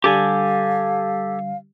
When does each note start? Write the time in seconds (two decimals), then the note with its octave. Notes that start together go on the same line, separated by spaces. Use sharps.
0.04 D3 G3 G4 A4 F5 G#5